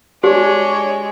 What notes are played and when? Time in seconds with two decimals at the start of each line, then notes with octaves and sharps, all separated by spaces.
0.24 G#3 D4 G4 C#5